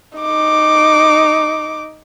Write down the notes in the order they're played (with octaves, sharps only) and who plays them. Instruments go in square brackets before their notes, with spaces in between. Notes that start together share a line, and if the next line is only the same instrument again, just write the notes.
[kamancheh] D#4 D6